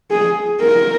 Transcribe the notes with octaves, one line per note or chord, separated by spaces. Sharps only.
G#4
A#4